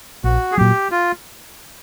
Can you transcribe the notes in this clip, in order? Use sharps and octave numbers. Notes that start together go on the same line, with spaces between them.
A#1 F#4
G#4
A#2 F#3 G4
F4